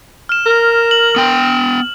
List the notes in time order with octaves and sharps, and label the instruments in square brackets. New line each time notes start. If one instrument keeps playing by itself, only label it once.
[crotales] F6 E7
[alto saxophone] A#4
[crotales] F#7
[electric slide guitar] B3 G5